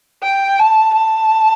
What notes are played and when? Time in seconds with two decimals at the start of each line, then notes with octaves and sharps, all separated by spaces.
0.23 G5
0.59 A5
0.95 A5